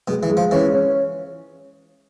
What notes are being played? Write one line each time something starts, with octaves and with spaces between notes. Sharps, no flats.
B2 G#3
E3
G#3
F3
E3 C#4
C#4